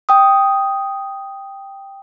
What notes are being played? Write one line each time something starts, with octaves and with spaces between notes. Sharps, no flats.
G5 D#6